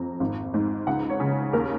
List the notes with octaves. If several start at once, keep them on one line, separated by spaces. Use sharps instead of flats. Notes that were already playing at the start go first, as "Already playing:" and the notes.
Already playing: F2 A#5
G#1
G#2
C#2 F#5
C#5
C#3
D#2 A#4